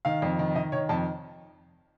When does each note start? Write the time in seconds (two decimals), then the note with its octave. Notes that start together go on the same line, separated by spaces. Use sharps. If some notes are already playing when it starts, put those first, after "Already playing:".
0.05 D#3 F5
0.22 F2
0.39 D#3
0.55 D#3 D#5
0.72 D#3 C#5
0.89 F2 A5